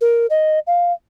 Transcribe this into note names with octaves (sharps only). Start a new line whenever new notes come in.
A#4
D#5
F5